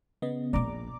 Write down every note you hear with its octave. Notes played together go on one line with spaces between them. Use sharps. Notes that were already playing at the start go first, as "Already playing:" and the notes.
C#3 B3 D#5
A#1 A#2 D5 A#5 D6